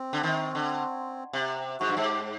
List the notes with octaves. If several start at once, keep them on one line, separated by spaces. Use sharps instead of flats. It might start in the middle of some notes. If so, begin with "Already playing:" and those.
Already playing: C4
D3
D#3
D3
C3
G#2 F#4
G2
G#2
G4